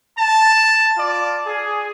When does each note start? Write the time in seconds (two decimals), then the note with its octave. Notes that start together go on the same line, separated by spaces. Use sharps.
0.17 A5
0.97 F4 D5
1.47 G#4